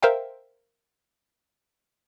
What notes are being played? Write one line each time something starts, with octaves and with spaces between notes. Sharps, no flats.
A#4 C5 E5 F5 G5